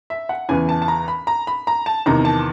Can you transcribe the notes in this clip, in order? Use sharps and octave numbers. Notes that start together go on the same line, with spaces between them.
E5
F#5
E2 C#3 E3 G#5
A5
A5
A#5
B5
A#5
B5
A#5
A5
E2 C3 D#3 A#5
A5